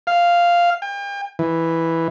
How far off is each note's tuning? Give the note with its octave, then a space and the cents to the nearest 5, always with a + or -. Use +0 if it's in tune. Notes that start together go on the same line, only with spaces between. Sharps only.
F5 -5
G5 +40
E3 -5